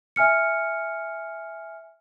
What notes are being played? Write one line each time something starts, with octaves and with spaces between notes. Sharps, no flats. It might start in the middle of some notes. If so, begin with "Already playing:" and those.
E5 G#5 F6 C#7